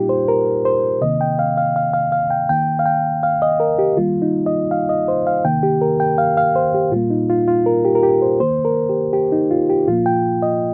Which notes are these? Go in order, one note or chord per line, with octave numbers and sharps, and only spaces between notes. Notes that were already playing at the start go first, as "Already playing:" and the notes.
Already playing: A#2 G3 A#3 D#4 F4 G4
C5
A#4
C5
C3 D#3 A#3 D#5
G5
F5
F5
F5
F5
F5
G5
D#3 A#3 G5
F5
G5
F5
D#5
A#4
G4
D#3 G3 A#3 F4
D#4
D#5
F5
D#5
C5
F5
C3 D#3 A#3 G5
G4
A#4
G5
F5
F5
C5
G4
A#2 G3 A#3 F4
D#4
F4
F4
A#4
G4
A#4
G4
C5
D#3 A#3 C5
A#4
G4
G4
D#4
F4
G4
A#2 F3 A#3 F4
G5
D#5